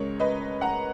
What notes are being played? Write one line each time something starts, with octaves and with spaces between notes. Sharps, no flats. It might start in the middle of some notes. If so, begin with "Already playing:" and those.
Already playing: C#2 C#3 G#3 C#4 A#4 C#5
B4 D#5
F#5 A#5